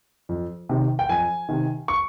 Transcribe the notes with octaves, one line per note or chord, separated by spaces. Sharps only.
F2
C3 D#3
G5
F2 G#5
C3 D#3
C#6